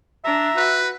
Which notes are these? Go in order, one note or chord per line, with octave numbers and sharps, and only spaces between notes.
D4 E5 A#5
F#4 B4